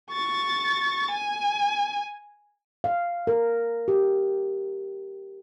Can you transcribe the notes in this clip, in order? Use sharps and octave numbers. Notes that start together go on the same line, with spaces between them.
C#6 A6
G#5
F5
A#4
G4